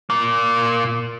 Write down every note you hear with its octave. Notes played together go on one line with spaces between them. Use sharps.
A#2 A#3